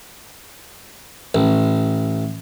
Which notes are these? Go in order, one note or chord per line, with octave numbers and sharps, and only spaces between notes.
A1